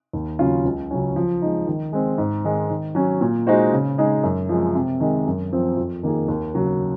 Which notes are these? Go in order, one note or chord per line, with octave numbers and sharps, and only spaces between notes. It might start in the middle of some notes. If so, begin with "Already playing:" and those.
D#2
C#3 F#3 C#4 F4
C#2
C#3 F#3 C#4
F3
G#3 D#4
D#3
G#3 C4
G#2
D#3 G#3
D#3
F#3 C#4
A#2
G#3 D#4 F#4 C5
C#3
G#3 D#4 G#4
F#2
F3 G#3
C3
D#3 G#3
F#2
F3 C4
F2
D#3 A#3 D#4 G#4
D#2
C#3 F#3